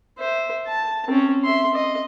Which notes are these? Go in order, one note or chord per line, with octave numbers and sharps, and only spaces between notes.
C5 E5
A5
C4 C#4
E5 C6
D#5